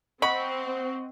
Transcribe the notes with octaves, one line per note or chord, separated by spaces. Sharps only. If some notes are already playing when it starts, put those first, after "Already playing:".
C4 D#5 F#5 B5 C#6